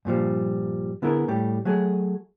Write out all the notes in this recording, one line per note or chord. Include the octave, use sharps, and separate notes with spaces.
G2 A#2 F3 G3
D3 B3 E4 G#4 A#4
A2 G3 A3 G4
F#3 A3 G#4